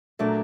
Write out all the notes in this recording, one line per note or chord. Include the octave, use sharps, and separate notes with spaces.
A#2 F#3 A3 A#3 D4